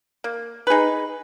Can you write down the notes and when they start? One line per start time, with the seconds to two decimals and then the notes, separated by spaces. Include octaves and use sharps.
0.24 A#3
0.67 D#4 G#4 B4